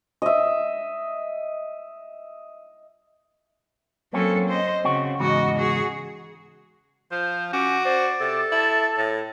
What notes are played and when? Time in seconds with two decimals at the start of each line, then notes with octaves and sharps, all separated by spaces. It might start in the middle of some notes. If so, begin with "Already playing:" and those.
0.22 D#5 E5
4.13 F#3 A#3 C4 C#4 A4
4.49 C5 D#5
4.84 C#3 C4 F#4
5.20 E2 G#2 C#3 F#4 D#5
5.58 F#4 G#4
7.11 F3 C5
7.53 C#4 F#4 D6
7.85 C5 D5
8.21 C3 A4
8.52 E4 A5
8.98 A2